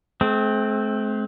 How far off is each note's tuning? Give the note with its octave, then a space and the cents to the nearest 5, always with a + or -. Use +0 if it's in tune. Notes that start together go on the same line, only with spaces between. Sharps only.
A3 -45 C4 +0